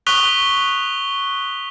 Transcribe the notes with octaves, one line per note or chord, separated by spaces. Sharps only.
C#6 D#6 F#6 B6 F7 G7